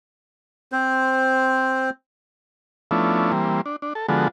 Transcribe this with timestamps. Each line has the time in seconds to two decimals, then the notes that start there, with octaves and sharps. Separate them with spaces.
0.72 C4 C5
2.91 F3 A3 B3 C#4 D4 E4
3.32 E3 G3 A#3 C4
3.66 D4
3.82 D4
3.95 A4
4.09 D3 F3 G#3 B3 F#4 A4